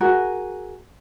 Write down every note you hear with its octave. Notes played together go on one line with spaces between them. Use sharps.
F#4 G#4 A#4